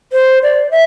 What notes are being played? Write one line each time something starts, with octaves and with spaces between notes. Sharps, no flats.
C5
D5
E5